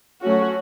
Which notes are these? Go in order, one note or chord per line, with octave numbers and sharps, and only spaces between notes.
F#3 A3 C#4 F#4